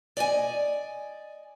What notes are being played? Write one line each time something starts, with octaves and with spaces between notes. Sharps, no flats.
D5 D#5 G5 G#5